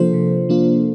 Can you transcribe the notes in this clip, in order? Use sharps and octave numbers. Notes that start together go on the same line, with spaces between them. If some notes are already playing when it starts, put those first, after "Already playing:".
Already playing: C3 F3 A#3 D4 F4 A4 C5
C3
F3 A#3 D4 F4